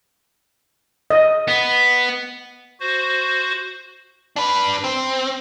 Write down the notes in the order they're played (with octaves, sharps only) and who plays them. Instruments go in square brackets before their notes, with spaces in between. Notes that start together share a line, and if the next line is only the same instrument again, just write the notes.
[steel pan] D#5
[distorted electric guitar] B3
[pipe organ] F#4 C5
[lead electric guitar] D4 B4
C4